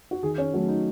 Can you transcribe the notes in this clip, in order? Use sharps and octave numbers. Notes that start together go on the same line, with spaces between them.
F#4
D#3 G#4
C#4
F#3 A3
D#4